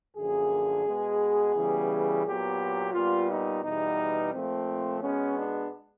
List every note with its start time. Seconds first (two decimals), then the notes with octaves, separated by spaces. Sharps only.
0.16 F#2 D3 F3 A#3 G#4
0.86 B2 G#3 B3
1.55 C#3 E3 G3 B3
2.24 A#2 F#3 B3 G4
2.93 A#2 G3 B3 F4
3.28 D#4
3.63 E2 B2 G3 B3 D#4
4.32 A#2 F3 A3 C4
5.01 B2 G#3 B3 C#4
5.36 D4